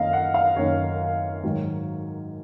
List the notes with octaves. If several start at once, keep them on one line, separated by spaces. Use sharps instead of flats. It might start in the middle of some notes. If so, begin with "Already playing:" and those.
Already playing: F#2 D#3 A#3 D#4 D#5 F5
F#5
F5
F#2 D#3 A#3 D#4 C#5
G#2 D#3 F#3